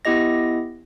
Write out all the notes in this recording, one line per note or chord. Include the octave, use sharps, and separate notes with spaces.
B3 E4 G4 D#5 A#6